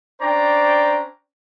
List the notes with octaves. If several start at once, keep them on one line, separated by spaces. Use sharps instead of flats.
C#4 D4 C5 D5 G5 A#5